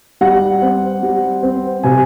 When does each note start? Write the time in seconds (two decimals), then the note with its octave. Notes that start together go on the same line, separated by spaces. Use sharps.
0.21 G3 F#5
0.62 C4
1.03 G3
1.43 C4
1.83 C3 G#5